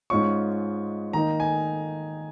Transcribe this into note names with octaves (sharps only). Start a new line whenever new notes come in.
G#2 G#3 C#4 F4 C#6
D#3 A#3 D#4 A#5
G#5